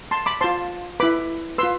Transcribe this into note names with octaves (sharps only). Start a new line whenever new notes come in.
A5 C6
B5 D6
F4 C5 A5 C6
E4 B4 B5 D6
F4 B4 C6 E6